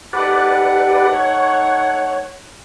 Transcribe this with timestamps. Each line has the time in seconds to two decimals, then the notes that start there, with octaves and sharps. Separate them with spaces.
0.13 A3 D#4 G4 B4 D5 F#5
1.13 C#5